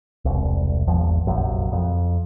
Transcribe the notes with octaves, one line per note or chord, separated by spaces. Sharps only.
E1 C2
G#1 E2 F3
F1 A#1 F#2
F2